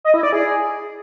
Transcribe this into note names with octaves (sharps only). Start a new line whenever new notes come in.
D#5
E4
D5
G#4